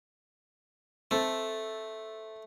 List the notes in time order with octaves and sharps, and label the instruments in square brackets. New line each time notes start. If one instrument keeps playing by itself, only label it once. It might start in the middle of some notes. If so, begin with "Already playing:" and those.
[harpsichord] A3 [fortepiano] C4 A4